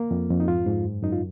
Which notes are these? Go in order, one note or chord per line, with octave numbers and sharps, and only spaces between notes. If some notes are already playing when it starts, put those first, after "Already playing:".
Already playing: A#3
F2
F2
D#4
G#2 F4
G#2
F#2
F#2 D#4
F4